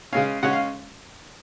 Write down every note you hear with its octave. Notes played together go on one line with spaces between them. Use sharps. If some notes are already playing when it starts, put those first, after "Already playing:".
C#3 G#3 C#4 F5
C#3 G#3 C#4 F#5
F5